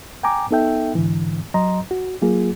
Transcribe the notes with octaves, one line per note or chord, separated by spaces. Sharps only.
G5 G#5 A#5 D6
B3 D#4 A4 E5 G5
G#2 D3 E3
F#3 D#5 A#5 C6
F#4
F#3 A#3 F4 G#4